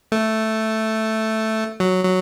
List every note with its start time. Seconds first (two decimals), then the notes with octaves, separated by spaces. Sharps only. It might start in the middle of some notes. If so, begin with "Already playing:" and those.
0.12 A3
1.80 F#3
2.05 F#3